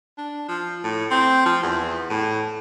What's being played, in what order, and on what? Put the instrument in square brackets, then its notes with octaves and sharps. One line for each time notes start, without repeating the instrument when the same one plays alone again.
[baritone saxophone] D4
F3
A2
C4
F3
E2
A2